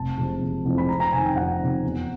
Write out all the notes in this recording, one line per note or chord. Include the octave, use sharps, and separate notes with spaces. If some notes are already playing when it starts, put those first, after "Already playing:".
Already playing: F1 A5
F2 C3 E3 G#3
F1
F2 C3 E3 G#3
B5
F2 A#5
A#5
C3 D#3 G#5
G5
F2 F#5
C3 D#3
E2